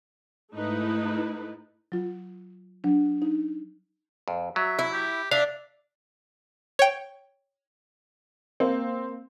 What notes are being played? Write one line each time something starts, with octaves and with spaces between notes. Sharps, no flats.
G#2 A3 D#4 E4 B4
F#3 F4
F#3 D4
D#4
F2
F#3 E5
E4
G4
D4 E5 F5
C#5 G5
A#3 C4